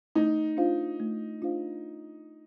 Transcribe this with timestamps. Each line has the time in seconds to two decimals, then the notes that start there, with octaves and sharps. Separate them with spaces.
0.15 A3 D#4
0.57 D4 F4 C5 F5
1.00 A3
1.42 D4 F4 C5 F5